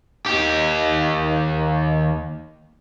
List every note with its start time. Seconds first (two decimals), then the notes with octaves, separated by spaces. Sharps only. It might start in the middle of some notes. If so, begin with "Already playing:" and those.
0.26 D#2 G4